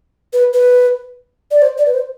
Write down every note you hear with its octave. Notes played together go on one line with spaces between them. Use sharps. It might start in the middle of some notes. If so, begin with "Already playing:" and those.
B4
B4
D5
C5
D5
B4
C5